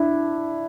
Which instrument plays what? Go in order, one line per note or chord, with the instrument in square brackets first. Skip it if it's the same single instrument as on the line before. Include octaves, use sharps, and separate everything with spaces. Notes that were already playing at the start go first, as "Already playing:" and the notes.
Already playing: [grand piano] D4 E4